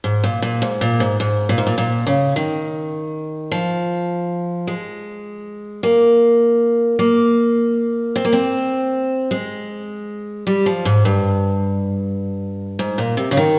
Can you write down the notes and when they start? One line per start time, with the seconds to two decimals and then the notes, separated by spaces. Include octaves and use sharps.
0.04 G#2
0.24 A#2
0.42 A#2
0.62 G#2
0.81 A#2
1.00 G#2
1.20 G#2
1.49 A#2
1.58 G#2
1.67 A#2
1.78 A#2
2.07 C#3
2.36 D#3
3.52 F3
4.67 G#3
5.83 A#3
6.99 A#3
8.16 C4
8.25 A#3
8.33 C4
9.31 G#3
10.47 G3
10.66 F3
10.85 G#2
11.05 G2
12.79 G#2
12.98 A#2
13.17 C3
13.31 C#3
13.37 D#3